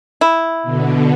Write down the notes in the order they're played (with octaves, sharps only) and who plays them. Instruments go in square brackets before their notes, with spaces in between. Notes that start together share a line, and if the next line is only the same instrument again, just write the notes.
[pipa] E4
[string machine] B2 D3